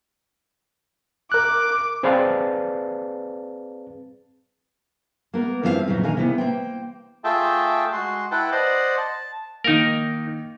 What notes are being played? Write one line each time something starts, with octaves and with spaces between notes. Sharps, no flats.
A#4 D6 F#6
C4 G#4 B4 D5 F5 A5
A#3 B3 A#4
G2 E3 F3 C4 G4 F5
F2 A#2 C#3 F#3
D3 D#3 A#4 F5 G#5
C3 E3 B3
A#3 C5 G5
A3 F4 G#4 E5 G5 A5
G#3 F#4 C6
E4 B4 F#5 G5 A5
C5 D5 D#5 F#5 C6
A5
D#3 A#3 D#4 A#4